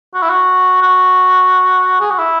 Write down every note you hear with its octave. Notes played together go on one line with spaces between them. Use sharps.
F#4
E4
F#4
F#4
G#4
F#4
E4